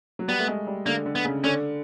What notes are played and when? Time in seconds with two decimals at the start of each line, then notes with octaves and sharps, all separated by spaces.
0.19 F#3
0.28 G3 B3
0.39 A3
0.47 G#3
0.67 G3
0.86 D3 A#3
1.06 D3
1.15 B3
1.25 C#3
1.44 D3 C#4